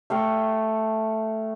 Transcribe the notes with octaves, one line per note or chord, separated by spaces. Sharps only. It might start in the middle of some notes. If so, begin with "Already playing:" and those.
A3 F5 G5 C#6